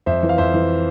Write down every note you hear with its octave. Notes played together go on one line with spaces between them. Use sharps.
F2 C5 E5
E3
F5
F2 C5 E5
E3